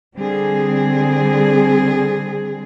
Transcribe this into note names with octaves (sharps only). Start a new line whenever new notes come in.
D3 G3 C4 G#4